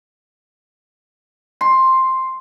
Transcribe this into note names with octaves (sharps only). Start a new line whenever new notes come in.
C6